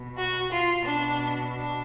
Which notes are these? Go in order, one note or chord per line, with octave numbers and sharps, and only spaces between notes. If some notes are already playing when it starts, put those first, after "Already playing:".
Already playing: B2
F#4
F4
B2 D4
D4